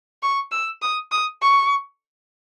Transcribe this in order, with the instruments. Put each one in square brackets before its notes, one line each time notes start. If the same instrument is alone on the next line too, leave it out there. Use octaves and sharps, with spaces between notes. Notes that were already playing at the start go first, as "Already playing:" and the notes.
[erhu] C#6
E6
D#6
D#6
C#6